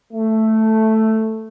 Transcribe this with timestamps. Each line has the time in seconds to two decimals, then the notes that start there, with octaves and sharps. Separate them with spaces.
0.13 A3